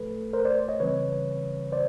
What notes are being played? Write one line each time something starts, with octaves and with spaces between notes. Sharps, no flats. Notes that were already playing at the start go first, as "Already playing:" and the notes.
Already playing: A2 F3 A3 A4 B4
A#4 C5
C5 D5
C#5 D#5
C#3 E3 G3 C4 B4 C#5
C5 D5